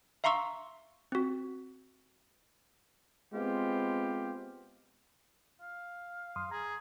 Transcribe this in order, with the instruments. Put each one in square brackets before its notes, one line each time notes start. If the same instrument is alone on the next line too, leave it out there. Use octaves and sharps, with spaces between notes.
[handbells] E5 F5 A#5 C6 C#6 E6
C4 F#4
[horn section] G#3 B3 C4 F4 G4
[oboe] F5
[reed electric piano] F#2 C6 D#6
[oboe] G#4 [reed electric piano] A#5